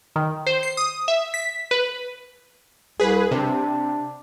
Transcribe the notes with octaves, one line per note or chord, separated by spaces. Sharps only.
D#3
C5
C7
D#6
E5
B6
B4
C2 G#4 B4
C3 D4